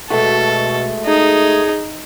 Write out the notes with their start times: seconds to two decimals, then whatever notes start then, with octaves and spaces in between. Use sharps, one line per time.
0.10 B2 G#3 A3 F#4 A4
1.05 D#4 G#4